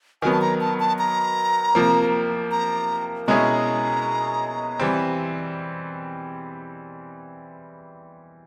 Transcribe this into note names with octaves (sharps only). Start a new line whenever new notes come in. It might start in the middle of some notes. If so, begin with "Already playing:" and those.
D#3 F#3 B3 G#5
A5
A#5
A5
A5
A#5
C3 F3 A#3
A#5
B2 G#3 C#4 E4 G#4 A#5
E3 G3 C4